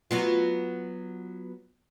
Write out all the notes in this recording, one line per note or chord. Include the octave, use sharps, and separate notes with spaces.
F#3 B3 F4